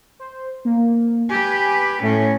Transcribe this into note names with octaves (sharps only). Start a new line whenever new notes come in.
C5
A#3
G4 B4 G#5
A2 A3 C#4